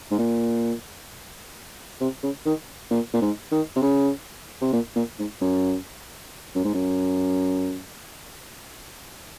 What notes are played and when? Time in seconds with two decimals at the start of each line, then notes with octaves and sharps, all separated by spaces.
0.11 G#2
0.18 A#2
2.01 C3
2.23 C#3
2.46 D#3
2.91 A#2
3.14 A#2
3.21 G#2
3.52 D#3
3.76 C3
3.82 C#3
4.61 C3
4.73 A#2
4.96 A#2
5.19 G#2
5.41 F#2
6.55 F#2
6.64 G#2
6.74 F#2